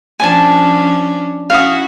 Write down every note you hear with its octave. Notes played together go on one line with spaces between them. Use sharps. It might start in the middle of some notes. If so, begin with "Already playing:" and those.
F3 C#4 D4 G#5 A5
C#4 E4 F#4 F5 D#6